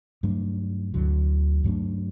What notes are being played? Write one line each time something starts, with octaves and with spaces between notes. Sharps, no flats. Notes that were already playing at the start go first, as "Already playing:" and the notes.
G2 F#3 A3 D4
D2 D3 F#3
G2 F#3 A3 D4